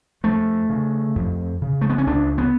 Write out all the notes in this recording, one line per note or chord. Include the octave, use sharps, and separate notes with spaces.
F2 A3
C#3
F2
C#3
A3
B3
C#4
C#2 D4
B3